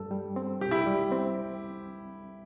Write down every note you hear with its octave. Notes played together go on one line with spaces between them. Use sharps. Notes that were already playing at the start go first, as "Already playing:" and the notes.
Already playing: G2 D4 A4
G3
C4
C2 G4
E4
G4
G3
C4